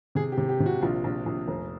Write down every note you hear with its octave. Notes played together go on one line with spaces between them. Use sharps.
C3 G#4
G4
C3
G4
C3
F#4
A#1 F4
A#1
A#1
F1